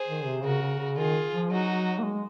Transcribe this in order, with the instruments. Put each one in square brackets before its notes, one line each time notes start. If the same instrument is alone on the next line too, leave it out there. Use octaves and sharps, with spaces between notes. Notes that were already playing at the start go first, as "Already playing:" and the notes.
Already playing: [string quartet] G#4 C5
[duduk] D#3
C3
[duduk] C#3 [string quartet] F#4 A#4
[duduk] C#3
C#3
[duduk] D#3 [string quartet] F4 G#4
[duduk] F3
[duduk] F#3 [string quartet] D#4 F#4
[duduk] A#3
G#3